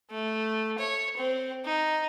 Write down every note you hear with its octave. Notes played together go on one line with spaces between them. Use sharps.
A3
C#5
C4
D#4